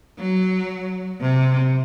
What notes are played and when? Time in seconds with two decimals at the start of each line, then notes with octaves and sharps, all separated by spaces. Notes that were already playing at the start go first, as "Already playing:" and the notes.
0.18 F#3
1.21 C3